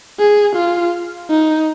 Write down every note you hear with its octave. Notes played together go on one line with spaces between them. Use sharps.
G#4
F4
D#4